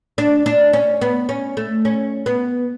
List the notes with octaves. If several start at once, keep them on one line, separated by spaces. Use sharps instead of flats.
D4
D4
C#4
B3
C#4
A3
C#4
B3